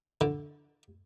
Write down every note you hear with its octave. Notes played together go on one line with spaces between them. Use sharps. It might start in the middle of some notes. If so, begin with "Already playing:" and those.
D3